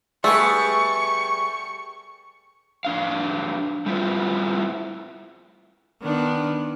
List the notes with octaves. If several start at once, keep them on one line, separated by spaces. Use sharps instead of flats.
G3 A3 B3 G#4 C#6
F2 D4 F5
G3 A3 C4 E4 F4 B4
D#3 B3 D4